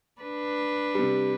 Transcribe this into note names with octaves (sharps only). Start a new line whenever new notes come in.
D4 B4
C3 G3